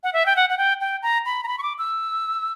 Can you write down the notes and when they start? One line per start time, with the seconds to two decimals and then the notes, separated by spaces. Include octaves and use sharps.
0.03 F#5
0.13 E5
0.26 G5
0.36 F#5
0.50 F#5
0.58 G5
0.81 G5
1.03 A#5
1.26 B5
1.43 A#5
1.48 B5
1.58 C#6
1.63 D6
1.78 E6